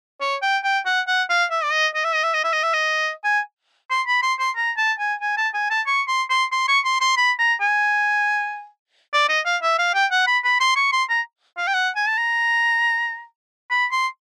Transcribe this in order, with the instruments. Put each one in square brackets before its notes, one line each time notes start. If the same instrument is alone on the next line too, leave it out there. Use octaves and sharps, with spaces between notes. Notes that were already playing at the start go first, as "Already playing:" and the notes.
[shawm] C#5
G5
G5
F#5
F#5
F5
E5
D5
D#5
D#5
E5
D#5
E5
D#5
E5
D#5
E5
D#5
G#5
C6
B5
C6
C6
A#5
A5
G#5
G#5
A5
G#5
A5
C#6
C6
C6
C6
C#6
C6
C6
B5
A#5
G#5
D5
D#5
F5
E5
F5
G5
F#5
B5
B5
C6
C#6
C6
A#5
F5
G5
F#5
G#5
A5
A#5
B5
C6